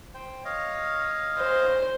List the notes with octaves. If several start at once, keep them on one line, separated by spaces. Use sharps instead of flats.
C5 G5
C#5 D#5 F5
C5